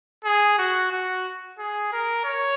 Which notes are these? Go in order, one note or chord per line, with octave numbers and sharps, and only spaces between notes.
G#4
F#4
F#4
G#4
A#4
C#5